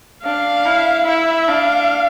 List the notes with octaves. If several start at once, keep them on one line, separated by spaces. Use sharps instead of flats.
D4 F5
E4
E4 E5
D4 F5